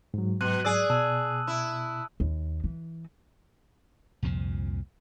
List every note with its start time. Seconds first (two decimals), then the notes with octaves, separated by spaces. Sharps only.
0.14 G#2 F#3
0.41 B2 F#6 D#7 F#7
0.65 G#4 D5 D#6 E6
0.90 B2 A5 E6
1.47 E4
2.20 D#2
2.64 E3
4.23 C2 F2 A#2 F3